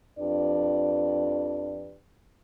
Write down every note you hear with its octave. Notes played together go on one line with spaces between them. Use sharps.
F2 F3 D4 G4 B4 D5